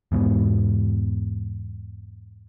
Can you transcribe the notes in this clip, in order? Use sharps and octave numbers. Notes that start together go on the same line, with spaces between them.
E2 G#2 B2